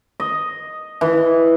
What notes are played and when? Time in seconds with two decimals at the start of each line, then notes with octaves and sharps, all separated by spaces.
0.20 D#5
1.01 E3